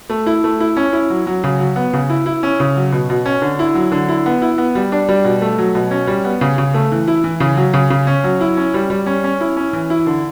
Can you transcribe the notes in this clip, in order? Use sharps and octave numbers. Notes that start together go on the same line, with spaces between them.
A3
E4
A3
E4
C#4
E4
F#3
F#3
C#3
F#3
B3
C#3
E4
E4
C#4
C#3
F#3
B2
B2
C#4
D3
E4
F#3
D3
E4
B3
E4
B3
G3
D4
G3
B2
A3
F#3
B2
C#4
G3
B3
C#3
C#3
A3
E3
E4
E3
C#3
F#3
C#3
C#3
C#4
F#3
E4
C#4
G3
G3
C#4
C#4
E4
C#4
E3
E4
D3